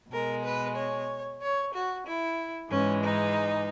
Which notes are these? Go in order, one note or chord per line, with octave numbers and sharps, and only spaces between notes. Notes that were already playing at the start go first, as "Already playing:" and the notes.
B2 G#3 A#4
B4
C#5
C#5
F#4
E4
G#2 E3 G#3 C#4
D#4